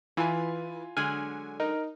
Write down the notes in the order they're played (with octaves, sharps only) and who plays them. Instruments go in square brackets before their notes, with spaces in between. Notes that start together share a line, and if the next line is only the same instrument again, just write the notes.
[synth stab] E3 [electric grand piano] F4 G#5 [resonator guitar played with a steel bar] B4
[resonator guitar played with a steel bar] D3 F#3 G#3 [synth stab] G#5 [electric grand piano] F6
[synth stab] D#4 [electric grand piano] A#4